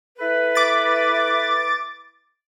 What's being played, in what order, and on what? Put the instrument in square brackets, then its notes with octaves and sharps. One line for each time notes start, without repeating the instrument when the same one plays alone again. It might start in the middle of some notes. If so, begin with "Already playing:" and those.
[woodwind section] E4 A4 B4
[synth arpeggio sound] D6 A6